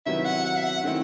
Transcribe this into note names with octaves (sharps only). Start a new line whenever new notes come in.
C3 D#3 F#3 B3 E4 E5
F#5
F#5
E5
F#5
D#3 A3 C4 E4